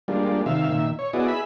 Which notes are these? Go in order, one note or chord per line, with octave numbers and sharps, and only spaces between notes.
G3 G#3 A#3 D4 F4
C3 D#3 E5 F5
A#2 D#3 E5
C#5
B3 E4 F#4 G#4 D5 D#5
G#4 E5 B5